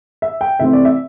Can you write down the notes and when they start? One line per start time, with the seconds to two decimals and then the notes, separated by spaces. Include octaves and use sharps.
0.22 E5
0.41 G5
0.60 C3 E3 A3 C4 E5
0.73 D5
0.85 E5